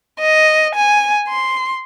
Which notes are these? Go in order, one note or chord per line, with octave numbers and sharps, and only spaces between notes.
D#5
G#5
C6